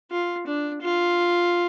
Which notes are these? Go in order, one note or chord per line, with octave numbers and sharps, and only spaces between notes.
F4
D4
F4